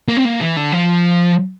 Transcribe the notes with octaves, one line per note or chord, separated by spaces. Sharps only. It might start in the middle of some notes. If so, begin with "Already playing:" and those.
A#3
C4
A#3
E3
D3
F3